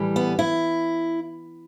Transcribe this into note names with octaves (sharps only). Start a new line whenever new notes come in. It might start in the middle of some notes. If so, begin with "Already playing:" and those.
Already playing: A2 E3 G3
B3
E4